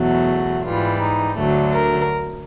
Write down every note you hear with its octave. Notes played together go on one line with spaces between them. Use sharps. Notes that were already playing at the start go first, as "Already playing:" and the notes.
Already playing: E2 B2 F#3 A3 F#4
G#2 E3 G3 F4
D#4
D2 D3 F#3 A3
A#4